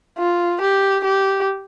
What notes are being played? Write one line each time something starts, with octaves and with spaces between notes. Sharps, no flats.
F4
G4
G4